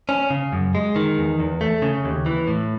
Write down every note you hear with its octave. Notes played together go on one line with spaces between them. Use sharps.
C#4
C#3
F#2
G#3
D#3
E2
E2
A3
C#3
D#2
E3
A2